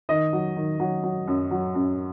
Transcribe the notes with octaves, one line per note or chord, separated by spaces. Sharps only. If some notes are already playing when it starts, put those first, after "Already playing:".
D#3 D#5
F#3
D#3
F#3
F#3
F#2
F#3
F#2